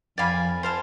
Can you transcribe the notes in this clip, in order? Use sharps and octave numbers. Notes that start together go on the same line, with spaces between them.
F2 D5 F5 G#5 B5
C5 F5 A5